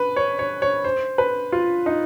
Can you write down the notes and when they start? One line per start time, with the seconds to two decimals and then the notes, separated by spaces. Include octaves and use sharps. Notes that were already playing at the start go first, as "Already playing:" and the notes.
Already playing: B4
0.16 C#5
0.39 C#5
0.62 C#5
0.84 C5
1.18 B4
1.52 F4
1.86 D#4